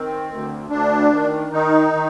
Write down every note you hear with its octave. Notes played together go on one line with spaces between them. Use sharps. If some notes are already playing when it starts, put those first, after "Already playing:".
Already playing: D#3 C4
D2
D2 D4
D#3
D#3 D#4
D#3